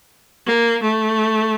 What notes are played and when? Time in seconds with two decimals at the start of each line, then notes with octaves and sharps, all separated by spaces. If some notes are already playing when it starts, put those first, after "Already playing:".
0.46 A#3
0.82 A3